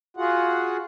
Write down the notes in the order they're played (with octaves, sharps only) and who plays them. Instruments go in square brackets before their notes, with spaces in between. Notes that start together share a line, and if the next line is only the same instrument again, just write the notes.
[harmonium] F4 F#4 G#4 F#5